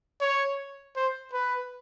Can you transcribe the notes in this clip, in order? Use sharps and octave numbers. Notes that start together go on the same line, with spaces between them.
C#5
C5
B4